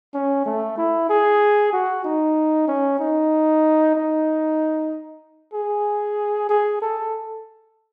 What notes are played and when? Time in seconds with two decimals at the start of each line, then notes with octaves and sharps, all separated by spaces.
0.14 C#4
0.46 A3
0.78 E4
1.09 G#4
1.73 F#4
2.04 D#4
2.68 C#4
2.99 D#4
3.95 D#4
5.53 G#4
6.49 G#4
6.82 A4